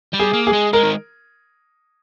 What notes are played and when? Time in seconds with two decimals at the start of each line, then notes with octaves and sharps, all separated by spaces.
0.13 G3
0.20 G#4
0.33 A#3
0.47 G#4
0.53 G#3
0.73 G#3 A#4
0.83 D#3